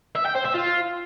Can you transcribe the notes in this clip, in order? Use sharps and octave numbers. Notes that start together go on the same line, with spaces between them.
E5
G5
C5
E5
F4